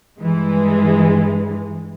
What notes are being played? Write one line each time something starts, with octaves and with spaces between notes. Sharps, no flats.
G2 E3 G#3